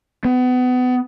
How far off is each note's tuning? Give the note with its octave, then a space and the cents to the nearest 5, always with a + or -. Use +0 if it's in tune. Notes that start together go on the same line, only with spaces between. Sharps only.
B3 +30